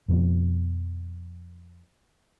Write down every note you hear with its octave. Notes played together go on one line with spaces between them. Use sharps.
F2 B2 F3